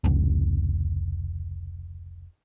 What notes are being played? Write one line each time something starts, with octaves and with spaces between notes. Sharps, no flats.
F1 C#2